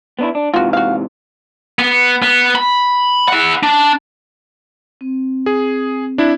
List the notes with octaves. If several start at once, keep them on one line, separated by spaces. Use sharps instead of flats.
B3 D4 E4
D4
G#2 C3 E3 F4 F#4
F#4 F5
B3
B3
B5
E4 F#5
D4
C4
G#4
D4 E4